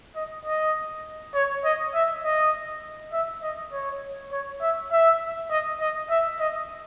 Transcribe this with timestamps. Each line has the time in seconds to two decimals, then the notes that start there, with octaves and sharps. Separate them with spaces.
0.16 D#5
0.45 D#5
1.34 C#5
1.65 D#5
1.95 E5
2.24 D#5
3.13 E5
3.43 D#5
3.72 C#5
4.32 C#5
4.62 E5
4.92 E5
5.50 D#5
5.80 D#5
6.10 E5
6.40 D#5